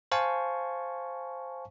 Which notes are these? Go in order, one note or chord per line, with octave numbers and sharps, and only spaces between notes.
C5 F5 G#5 A5 C#6